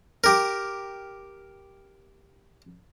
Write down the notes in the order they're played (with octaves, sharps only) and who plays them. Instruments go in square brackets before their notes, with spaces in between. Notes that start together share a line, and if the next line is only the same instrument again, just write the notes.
[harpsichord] G4 A#4